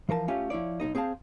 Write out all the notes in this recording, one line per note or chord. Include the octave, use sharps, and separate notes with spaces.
E3 F3 A#4 A5
A3 C#4 F4 G4 G#5
F3 E4 C#5 D5
B1 E2 D#4 D#5
C4 G#4 C5 F5 A5